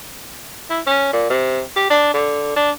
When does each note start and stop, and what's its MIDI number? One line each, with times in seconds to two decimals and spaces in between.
0.70 0.81 64
0.87 1.10 61
1.13 1.28 46
1.30 1.62 48
1.76 1.88 67
1.90 2.12 62
2.14 2.52 50
2.56 2.71 62